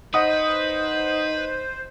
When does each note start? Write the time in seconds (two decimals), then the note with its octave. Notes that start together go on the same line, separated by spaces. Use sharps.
0.14 D#4 B4 C5 D#5 F#5 D#6